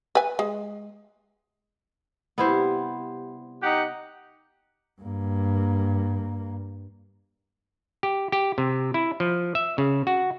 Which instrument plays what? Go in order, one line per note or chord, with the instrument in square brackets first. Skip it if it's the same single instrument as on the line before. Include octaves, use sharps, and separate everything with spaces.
[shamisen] B4 G#5
G#3
[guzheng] C3 G3 [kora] B3 E4 C5
[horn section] D#4 G4 F#5
[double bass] G2 A#3
[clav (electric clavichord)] G4
G4
C3
E4
F3
E5
C#3
F#4